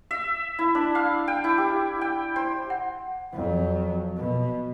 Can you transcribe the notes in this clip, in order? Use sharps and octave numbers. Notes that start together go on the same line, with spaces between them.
E5
E4
D4
F5
G5
E4
G4
G5
C5
F#5
F2 F#3
B2